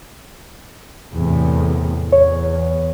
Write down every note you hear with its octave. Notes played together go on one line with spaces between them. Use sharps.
E2 A2 C3
E2 C#5